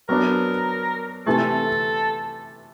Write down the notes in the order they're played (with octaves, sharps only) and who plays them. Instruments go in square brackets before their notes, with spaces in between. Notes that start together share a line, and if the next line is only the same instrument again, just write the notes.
[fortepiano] F#3 B3 D4 [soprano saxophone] A#4
[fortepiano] C3 E3 A3 [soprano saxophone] A4